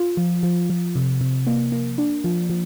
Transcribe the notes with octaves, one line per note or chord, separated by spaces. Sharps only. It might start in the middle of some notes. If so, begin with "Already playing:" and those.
Already playing: F4
F3
F3
F3
C3
C3
A#3
A#3
D4
F3
F3